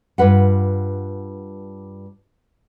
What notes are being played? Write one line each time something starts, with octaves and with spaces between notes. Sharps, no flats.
G2 F4 B4 F#5